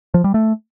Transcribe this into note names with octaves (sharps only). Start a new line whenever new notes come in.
F3
G3
A3